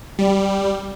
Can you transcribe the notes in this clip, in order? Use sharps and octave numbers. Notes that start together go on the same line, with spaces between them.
G3